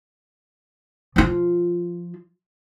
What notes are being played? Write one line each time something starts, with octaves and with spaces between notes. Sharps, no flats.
F3 F4